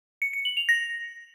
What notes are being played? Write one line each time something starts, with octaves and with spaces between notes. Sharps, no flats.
C#7
C#7
F#7
F7
A#6